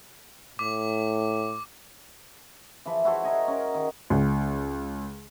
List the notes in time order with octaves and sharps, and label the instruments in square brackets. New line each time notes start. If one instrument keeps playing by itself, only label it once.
[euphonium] A2 [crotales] D6
[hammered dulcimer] E3 F3 B4
E4 F#4 A4 C5
A#4 D#5 G#5
C#4 A#4
D#3
[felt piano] C#2